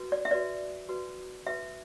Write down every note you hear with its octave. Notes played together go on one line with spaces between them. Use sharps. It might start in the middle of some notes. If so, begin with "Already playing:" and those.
Already playing: F#4 B4
D5
E5
F#4 B4 D5
F#4 B4
F#4 B4 E5